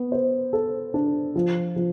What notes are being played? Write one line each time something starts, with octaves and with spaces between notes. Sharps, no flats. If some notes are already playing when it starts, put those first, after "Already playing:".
Already playing: B3
C5
A4
D4
F3
F3